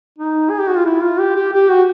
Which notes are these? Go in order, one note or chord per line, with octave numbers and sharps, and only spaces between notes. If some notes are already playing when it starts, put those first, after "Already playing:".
D#4
G#4
G4
F#4
F4
E4
F4
G4
G4
G4
F#4